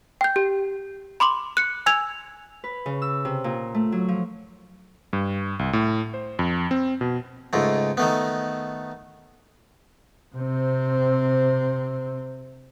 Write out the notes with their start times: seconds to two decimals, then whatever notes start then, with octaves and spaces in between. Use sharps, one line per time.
0.21 G5 G6
0.36 G4
1.20 B5 C6 D6 F#7
1.57 F#6 C#7
1.86 G#5 E6 G#6 F7
2.64 B4
2.86 C#3
3.02 E6
3.25 C3
3.44 A#2
3.74 A3
3.92 F#3
4.08 F3
5.13 G2
5.59 C2
5.73 A2
6.14 C5
6.39 F2
6.71 C4
7.01 B2
7.53 C#2 G#2 A3
7.97 D#3 A3 B3
10.35 C3 C4